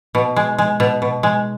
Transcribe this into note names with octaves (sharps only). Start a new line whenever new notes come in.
B2
G#3
G#3
B2
B2
G#3